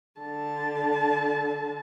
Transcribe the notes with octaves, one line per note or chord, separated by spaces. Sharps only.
D3 A5